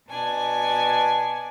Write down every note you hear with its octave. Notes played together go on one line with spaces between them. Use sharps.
B2 D4 G#5